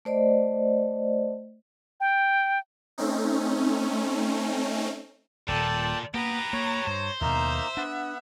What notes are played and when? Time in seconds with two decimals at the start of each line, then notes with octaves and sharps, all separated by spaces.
0.05 A3 C5 D5 D#5
2.00 G5
2.98 A3 C4 C#4 D#4
5.48 D#1 A#2 A4 D5 G5 A5
6.14 A#3 B3 G4 B4 A#5
6.53 A#3 C#5
6.87 G2 C5
7.21 D#2 B2 A#3 D#4 E5 A#5
7.77 B3 D4 F#5